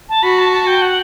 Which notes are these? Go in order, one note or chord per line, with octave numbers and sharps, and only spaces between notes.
A5
F#4 B5
A5
A5
G5
F#5